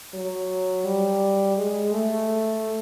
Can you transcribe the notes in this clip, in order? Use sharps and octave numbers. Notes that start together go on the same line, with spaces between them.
F#3
G3
G#3
A3